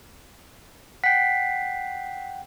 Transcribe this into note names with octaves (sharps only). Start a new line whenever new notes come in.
F#5 G5 B6 C7